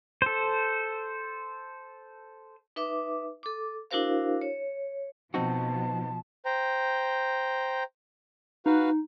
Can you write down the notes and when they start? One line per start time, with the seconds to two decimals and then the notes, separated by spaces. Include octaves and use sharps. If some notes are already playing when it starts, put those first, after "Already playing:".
0.22 A4 C5
2.76 D#4 B4 E5 D6
3.43 A4 D6
3.91 D4 E4 F#4 A#4 C5 F5
4.41 C#5
5.34 B2 F3 C4 D#4 F#4 A5
6.45 C5 G5 A#5
8.66 D#4 F#4 B4 F5